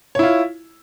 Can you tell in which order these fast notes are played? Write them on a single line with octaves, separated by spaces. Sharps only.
C#5 E4 F4